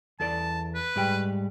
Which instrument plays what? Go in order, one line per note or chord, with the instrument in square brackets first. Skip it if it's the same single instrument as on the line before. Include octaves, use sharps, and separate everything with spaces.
[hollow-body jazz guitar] E2 A4 D5 [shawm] A5
[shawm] B4
[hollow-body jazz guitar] G#2 G3 G5